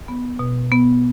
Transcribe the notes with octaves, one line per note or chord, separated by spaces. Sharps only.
B3
B2
B3